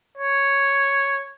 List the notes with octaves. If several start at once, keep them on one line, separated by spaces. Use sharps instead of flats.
C#5